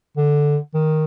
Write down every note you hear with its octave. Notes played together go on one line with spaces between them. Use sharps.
D3
D#3